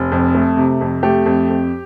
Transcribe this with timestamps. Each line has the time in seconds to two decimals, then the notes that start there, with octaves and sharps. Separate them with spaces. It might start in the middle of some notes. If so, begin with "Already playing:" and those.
Already playing: F1
0.12 F2
0.35 A3
0.57 C3
0.81 F2
1.03 A3 G4
1.26 F2
1.50 F2